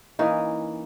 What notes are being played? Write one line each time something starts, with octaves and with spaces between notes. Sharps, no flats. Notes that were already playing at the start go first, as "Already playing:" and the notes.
E3 A#3 C#4 D#4